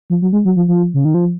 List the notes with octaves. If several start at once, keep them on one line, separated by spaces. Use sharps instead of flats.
F3
F#3
G#3
F#3
F3
F3
C#3
D#3
F3